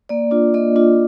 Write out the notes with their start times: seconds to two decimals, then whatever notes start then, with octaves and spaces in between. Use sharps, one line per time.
0.09 A#3 D5
0.31 D4 F4
0.54 A#3 D#5
0.76 D4 F4